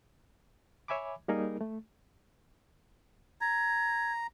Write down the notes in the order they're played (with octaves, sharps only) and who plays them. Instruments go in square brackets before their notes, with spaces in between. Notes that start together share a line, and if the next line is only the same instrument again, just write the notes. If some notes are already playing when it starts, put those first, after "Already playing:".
[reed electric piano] C#5 E5 G#5 B5 D6
G3 A#3 D#4 G#4 A#4
A3
[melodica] A#5 [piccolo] G#6